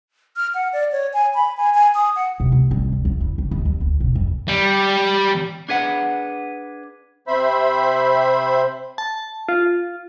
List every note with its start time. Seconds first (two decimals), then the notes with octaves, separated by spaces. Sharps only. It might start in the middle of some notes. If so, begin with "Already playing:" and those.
0.36 F6
0.55 F#5
0.73 D5
0.92 C#5
1.14 G#5
1.35 B5
1.57 G#5
1.74 G#5
1.95 D#6
2.16 F#5
2.40 C3
2.52 A3
2.71 C2
2.92 D2
3.05 E2
3.21 C#3
3.38 C#3
3.51 D#2
3.65 F2
3.80 D2
4.00 B2
4.15 F2
4.48 G3
5.69 D4 G#4 B4 F#5
7.27 C3 C5 E5 B5
8.98 A5
9.49 F4